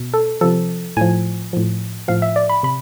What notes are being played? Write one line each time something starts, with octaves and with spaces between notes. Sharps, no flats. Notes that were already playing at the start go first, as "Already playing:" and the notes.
Already playing: B2
A4
C3 F3 A4
A2 F3 G#5
A2 F3
A2 F3 F5
E5
D5
B5
C3 B5